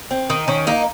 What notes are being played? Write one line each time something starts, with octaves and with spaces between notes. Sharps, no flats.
C4
D#3 D#4
D#3 C#4
A#3 D#4